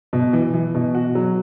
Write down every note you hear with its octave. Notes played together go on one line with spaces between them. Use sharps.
B2
E3
E3
B2
F#4
F#3